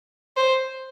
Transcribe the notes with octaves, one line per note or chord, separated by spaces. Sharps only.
C5